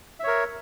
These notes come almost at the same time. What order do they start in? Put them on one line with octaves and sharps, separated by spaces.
E5 C#5 A#4